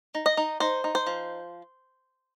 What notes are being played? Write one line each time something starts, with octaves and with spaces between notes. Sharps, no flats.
D#4
D#5
D#4
D#4 C5
D#4
C5
F3